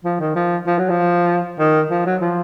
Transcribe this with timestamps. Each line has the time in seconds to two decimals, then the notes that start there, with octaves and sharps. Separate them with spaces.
0.05 F3
0.20 D#3
0.35 F3
0.67 F3
0.78 F#3
0.90 F3
1.59 D#3
1.90 F3
2.06 F#3
2.21 F3